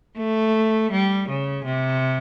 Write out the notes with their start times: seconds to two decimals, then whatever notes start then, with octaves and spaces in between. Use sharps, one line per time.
0.18 A3
0.92 G3
1.29 C#3
1.65 C3